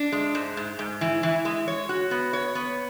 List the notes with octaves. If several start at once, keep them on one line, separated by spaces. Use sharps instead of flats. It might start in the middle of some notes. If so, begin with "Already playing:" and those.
Already playing: D4
G#3
G#2
G#2
G#2
E3
E3
G#3
C#5
F#4
B3
C#5
B3